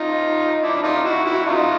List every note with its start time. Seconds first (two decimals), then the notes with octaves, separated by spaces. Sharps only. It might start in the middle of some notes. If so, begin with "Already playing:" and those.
Already playing: D#4 F4
0.63 D4 E4
0.83 D#4 F4
1.04 E4 F#4
1.25 E4 F#4
1.46 D#4 F4